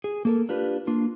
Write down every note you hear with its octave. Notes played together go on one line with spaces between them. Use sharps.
G#4
A#3 A4 A#4
D4 F4 G4 B4
A#3 D4 F4